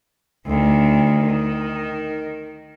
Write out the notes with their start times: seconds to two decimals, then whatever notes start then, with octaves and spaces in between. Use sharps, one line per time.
0.46 D2 D#3
1.25 D#3